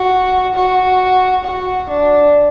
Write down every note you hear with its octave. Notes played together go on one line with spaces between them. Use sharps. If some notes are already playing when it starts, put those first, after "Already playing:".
Already playing: F#4
F#4
F#4
D4